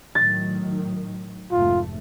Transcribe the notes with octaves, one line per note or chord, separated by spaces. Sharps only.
A2 D#3 F#3 A6
F1 G#2 A3 F4